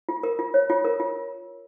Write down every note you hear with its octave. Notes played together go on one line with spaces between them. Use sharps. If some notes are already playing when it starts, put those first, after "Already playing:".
F4
A#4
F4
C#5
F4
A#4
F4